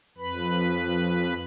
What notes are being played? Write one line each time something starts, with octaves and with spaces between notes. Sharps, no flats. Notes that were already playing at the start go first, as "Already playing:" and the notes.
F2 B4 B5